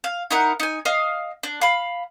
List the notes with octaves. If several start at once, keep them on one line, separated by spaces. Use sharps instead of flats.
F5
D#4 E4 A#4 F#5
D#4 G#5
D#5 F5 D#6 F6
D4
F5 B5